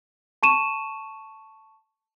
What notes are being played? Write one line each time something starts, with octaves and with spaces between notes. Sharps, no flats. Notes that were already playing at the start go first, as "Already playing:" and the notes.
A5 C#6 D#7 E7